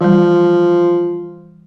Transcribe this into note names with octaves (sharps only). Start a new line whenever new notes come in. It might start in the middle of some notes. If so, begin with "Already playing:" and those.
E3 F3 G3